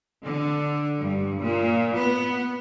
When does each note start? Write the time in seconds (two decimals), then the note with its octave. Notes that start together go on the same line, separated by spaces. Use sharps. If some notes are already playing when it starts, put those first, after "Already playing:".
0.23 D3
1.01 G2
1.43 A#2
1.97 B3